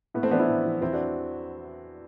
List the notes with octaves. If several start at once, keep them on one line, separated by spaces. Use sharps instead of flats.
A2 B3
A3 C4
E3 B3 D4
C4 E4
A2
E3
E2 C4 E4
D4 F#4